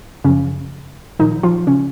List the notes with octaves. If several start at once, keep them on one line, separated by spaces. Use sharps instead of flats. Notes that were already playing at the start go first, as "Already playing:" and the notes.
F#2 C#3 F3 C#4
A#2 D#3 F3 D#4
F3 F4
C#3 C#4